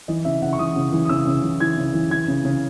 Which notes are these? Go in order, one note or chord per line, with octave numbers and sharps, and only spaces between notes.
E3 D#5
C#3 E5
C#3 F#5
C#6
E3 D#6
C#3
E3
D#6
C#3 E6
C#3
E3
E3 G#6
C#3
E3
E3 G#6
C#3
C#3